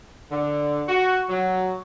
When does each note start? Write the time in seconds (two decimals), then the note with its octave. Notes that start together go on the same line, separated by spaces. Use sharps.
0.32 D3
0.88 F#4
1.29 F#3